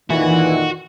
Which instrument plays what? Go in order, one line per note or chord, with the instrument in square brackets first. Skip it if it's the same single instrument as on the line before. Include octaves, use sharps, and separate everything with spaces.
[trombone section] F2 A#2 D#3 [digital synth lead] E3 [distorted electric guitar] F#4